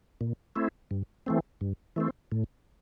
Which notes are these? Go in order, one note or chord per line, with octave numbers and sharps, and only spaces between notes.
A#2
A3 C4 E4
G2
E3 A3 C4
G2
E3 A3 C4
A2